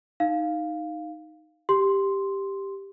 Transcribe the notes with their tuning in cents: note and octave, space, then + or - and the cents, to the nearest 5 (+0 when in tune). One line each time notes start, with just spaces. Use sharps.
D#4 +0 F5 +0
G4 +0 C6 +0